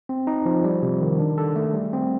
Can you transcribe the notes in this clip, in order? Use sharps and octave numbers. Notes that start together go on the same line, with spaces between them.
C4
D#4
F3
G3
C3
D#3
D4
A4
A3
G3
C4